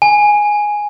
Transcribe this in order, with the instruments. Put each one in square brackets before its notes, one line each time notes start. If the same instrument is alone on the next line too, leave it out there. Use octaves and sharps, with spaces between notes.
[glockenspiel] G#5